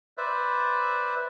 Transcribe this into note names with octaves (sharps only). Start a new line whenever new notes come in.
B4 C5 D5 E5